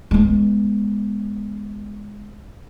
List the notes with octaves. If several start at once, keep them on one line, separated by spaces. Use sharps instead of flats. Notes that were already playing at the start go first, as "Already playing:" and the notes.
G#3 B3